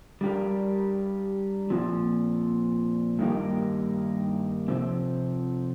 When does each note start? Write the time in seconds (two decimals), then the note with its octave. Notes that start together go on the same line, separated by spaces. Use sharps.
0.21 G3 D4 G4 A#4
1.70 A#2 F3 C4
3.19 G2 D#3 A#3 D#4 G4
4.68 C3 F3 C4